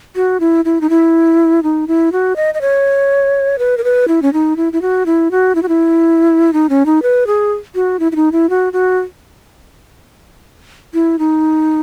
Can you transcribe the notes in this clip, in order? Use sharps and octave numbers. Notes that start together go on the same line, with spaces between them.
F#4
E4
E4
D#4
E4
D#4
E4
F#4
D#5
D#5
C#5
B4
A#4
B4
E4
C#4
D#4
E4
E4
F#4
E4
F#4
E4
F#4
E4
D#4
C#4
D#4
B4
G#4
F#4
E4
E4
D#4
E4
F#4
F#4
E4
D#4